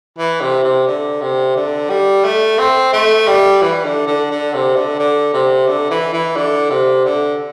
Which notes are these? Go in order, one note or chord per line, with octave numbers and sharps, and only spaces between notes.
E3
C3
C3
D3
C3
D3
G3
A3
C4
A3
G3
E3
D3
D3
D3
C3
D3
D3
C3
D3
E3
E3
D3
C3
D3